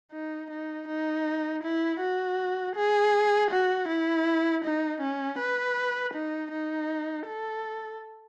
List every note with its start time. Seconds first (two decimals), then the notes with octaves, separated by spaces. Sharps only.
0.13 D#4
0.51 D#4
0.88 D#4
1.64 E4
2.01 F#4
2.76 G#4
3.51 F#4
3.88 E4
4.64 D#4
5.01 C#4
5.39 B4
6.14 D#4
6.52 D#4
7.27 A4